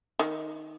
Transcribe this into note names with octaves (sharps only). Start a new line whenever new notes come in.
D#3